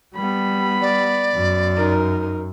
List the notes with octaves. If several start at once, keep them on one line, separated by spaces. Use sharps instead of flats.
G3 B3 B5
D5
F#2
D#4 A#4